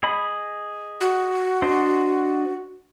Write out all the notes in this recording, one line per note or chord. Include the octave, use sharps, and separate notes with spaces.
G#4 D#5 B5
F#4
D4 C5 D#5